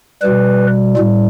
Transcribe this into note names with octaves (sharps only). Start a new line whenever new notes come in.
B2 G3 B4
A2 G3